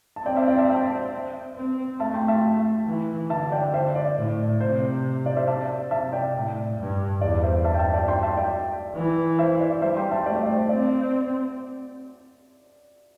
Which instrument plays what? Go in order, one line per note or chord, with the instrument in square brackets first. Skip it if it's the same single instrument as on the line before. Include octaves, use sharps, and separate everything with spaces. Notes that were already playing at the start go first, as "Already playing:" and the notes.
[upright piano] A5
[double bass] C4 [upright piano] D5 G5
[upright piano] C5 E5
D5 G5
E5 A5
E5 A5
[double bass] C4
[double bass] A3 [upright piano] E5 A5
[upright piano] G5 C6
E5 A5
[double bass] E3
[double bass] D3 [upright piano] E5 A5
[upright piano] D5 G5
C5 E5
D5
[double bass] A2
[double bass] C3 [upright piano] C5
[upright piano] D5
C5 E5
E5 A5
[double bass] C3 [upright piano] E5 A5
[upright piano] D5 G5
[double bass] A2
G2
[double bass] E2 [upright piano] D5
[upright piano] C5 E5
[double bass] G2 [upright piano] E5 A5
[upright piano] G5
E5 A5
D5 G5
G5 C6
E5 A5
D5 G5
[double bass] E3
[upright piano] C5 E5
D5
[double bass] G3 [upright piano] C5 E5
[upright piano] G5 C6
E5 A5
[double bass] A3 [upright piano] D5 G5
[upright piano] D5
C5
C5
[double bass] C4 [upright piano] D5